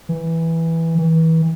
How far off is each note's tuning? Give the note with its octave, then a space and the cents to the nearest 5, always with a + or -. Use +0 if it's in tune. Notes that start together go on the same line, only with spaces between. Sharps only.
E3 -5
E3 -30